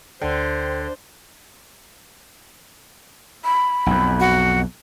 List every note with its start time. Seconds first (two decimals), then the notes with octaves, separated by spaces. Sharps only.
0.22 D2 D3 C5 G5
3.45 B5
3.86 B1 F2
4.20 F#4